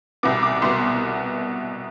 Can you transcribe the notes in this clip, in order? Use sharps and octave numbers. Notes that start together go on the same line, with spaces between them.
C2 B2 B3 D6
D6
C2 B2 B3 C6